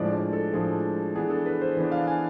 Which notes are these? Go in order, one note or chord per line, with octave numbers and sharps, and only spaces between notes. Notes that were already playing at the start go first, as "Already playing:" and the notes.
Already playing: A2 F3 G#3 D4 D5
D5
A4
A2 F3 G#3 D4 G#4
E3 B3 D4 G#4
A4
B4
C5
E3 B3 D4
F5
G#5